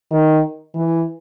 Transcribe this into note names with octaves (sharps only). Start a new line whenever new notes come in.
D#3
E3